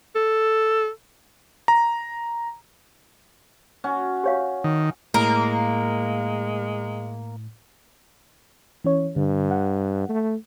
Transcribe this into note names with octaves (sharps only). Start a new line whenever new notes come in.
A4
A#5
C#4 F#4
G4 C#5 F5
D#3
A2 G#3 A#3 A#4
E3 C#4 C#5
G2 D3
F#5
A3